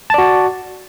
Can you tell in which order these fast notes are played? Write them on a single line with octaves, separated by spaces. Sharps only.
A5 D5 F#4